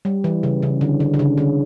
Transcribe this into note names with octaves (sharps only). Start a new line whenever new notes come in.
G3
E3
C#3
C#3
D3
D3
D3
C#3
D3